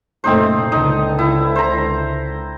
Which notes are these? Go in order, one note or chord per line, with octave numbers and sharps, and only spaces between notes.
F#1 A#2 A3 C4 D#4 C5
C#2 D3 D#4
E4
C5 A#5